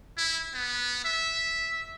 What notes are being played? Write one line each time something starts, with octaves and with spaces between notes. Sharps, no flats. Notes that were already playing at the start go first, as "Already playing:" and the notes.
E4
B3
E5